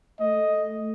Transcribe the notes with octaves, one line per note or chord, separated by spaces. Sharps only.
A3 D#5